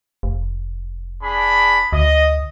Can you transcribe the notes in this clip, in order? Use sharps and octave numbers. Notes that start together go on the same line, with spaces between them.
F1
D4 G#4 B5
D2 D#5